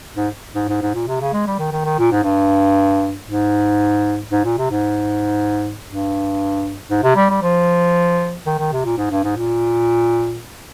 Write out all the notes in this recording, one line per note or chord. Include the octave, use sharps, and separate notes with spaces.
G#2
G#2
G#2
G#2
A#2
C3
C#3
G#3
G3
D#3
D#3
D#3
A#2
G#2
G2
G#2
G#2
A#2
C3
G#2
G2
G#2
C3
G3
G3
F3
D#3
D#3
C3
A#2
G#2
G2
G#2
A#2